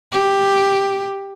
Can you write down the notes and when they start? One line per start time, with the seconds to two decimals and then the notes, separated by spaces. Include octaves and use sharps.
0.12 G4